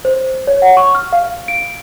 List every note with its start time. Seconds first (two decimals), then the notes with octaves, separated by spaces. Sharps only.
0.05 C5
0.47 C#5
0.62 F#5
0.77 C#6
0.95 F6
1.13 F5
1.48 D7